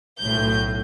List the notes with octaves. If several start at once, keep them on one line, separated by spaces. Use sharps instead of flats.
B1 A2 G6